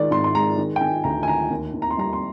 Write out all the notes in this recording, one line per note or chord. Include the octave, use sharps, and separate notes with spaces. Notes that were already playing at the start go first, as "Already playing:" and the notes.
Already playing: D#3 G#3 D5
G#2 C6
C6
G#3 A#5
D#3
G5
D#3 G#5
D2 A#5
G#5
D#3 A#5
D#2
D#2
A#5
C6
G3 A#5
C6